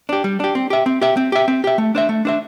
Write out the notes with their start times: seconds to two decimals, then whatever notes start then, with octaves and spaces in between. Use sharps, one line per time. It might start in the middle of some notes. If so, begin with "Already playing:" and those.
0.09 D4 G4
0.24 G3
0.40 D4 G4
0.55 C4
0.70 G4 E5
0.86 C4
1.01 G4 E5
1.17 C4
1.32 G4 E5
1.48 C4
1.64 G4 E5
1.78 A3
1.95 D4 C5 E5
2.09 A3
2.25 D4 C5 E5